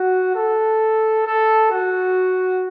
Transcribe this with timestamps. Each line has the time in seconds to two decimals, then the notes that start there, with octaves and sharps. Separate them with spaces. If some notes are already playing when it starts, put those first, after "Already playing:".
Already playing: F#4
0.36 A4
1.27 A4
1.72 F#4